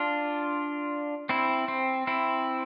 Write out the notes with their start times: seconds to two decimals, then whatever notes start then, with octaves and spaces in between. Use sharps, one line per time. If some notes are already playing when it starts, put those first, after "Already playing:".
Already playing: D4 F4
1.29 C4 E4
1.68 C4
2.07 C4 E4